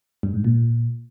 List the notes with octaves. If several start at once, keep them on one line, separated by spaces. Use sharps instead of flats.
G2
G#2
A#2